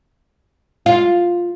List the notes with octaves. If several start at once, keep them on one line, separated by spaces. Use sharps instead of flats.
F4